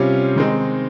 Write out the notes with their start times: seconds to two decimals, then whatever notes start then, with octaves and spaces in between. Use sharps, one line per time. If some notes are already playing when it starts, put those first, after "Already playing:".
Already playing: C3 G3 C#4 F4
0.36 D#3 G#3 C4 D#4